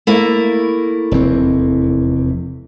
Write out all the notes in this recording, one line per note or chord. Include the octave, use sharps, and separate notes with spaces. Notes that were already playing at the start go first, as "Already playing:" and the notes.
A3 A#3 E4
F1 E2 C4